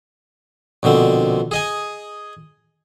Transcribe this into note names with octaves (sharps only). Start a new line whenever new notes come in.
A#1 B2 D3 C4
G#4 D#5 G#5